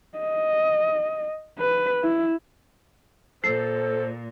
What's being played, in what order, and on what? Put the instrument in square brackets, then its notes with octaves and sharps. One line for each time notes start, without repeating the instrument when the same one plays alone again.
[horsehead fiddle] D#5
B4
E4
[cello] A#2 [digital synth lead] A4 [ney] C5 [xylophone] C7